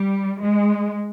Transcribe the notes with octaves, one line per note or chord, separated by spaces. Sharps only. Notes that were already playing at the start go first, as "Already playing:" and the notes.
Already playing: G3
G#3